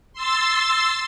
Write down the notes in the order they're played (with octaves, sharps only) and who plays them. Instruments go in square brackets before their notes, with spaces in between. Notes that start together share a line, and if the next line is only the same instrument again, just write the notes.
[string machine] C6 E6 A6